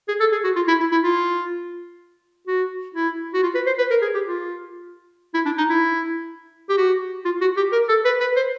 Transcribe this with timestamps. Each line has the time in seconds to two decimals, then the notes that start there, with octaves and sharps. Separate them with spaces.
0.08 G#4
0.20 A4
0.32 G#4
0.44 F#4
0.56 F4
0.68 E4
0.81 E4
0.92 E4
1.04 F4
2.48 F#4
2.95 E4
3.34 F#4
3.43 F4
3.55 B4
3.67 C5
3.78 B4
3.91 A#4
4.02 G#4
4.15 G4
4.26 F4
5.34 E4
5.46 D4
5.58 D#4
5.70 E4
6.69 G4
6.78 F#4
7.25 F4
7.41 F#4
7.57 G4
7.73 A#4
7.89 A4
8.05 B4
8.20 B4
8.37 C5